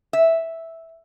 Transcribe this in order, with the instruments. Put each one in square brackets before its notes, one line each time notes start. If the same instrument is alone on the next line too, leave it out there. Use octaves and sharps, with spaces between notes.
[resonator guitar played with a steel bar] E5